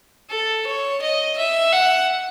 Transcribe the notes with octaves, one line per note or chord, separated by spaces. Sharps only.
A4
C#5
D#5
E5
F#5